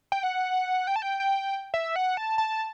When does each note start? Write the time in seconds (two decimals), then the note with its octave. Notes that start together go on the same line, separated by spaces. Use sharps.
0.12 G5
0.23 F#5
0.87 G5
0.96 A5
1.02 G5
1.20 G5
1.74 E5
1.96 F#5
2.17 A5
2.38 A5